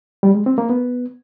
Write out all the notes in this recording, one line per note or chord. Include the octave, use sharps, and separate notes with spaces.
G3
G#3
C4
A#3
B3